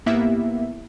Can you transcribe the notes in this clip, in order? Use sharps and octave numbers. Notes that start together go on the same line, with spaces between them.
G#2 A#3 B3 E4 G4 E5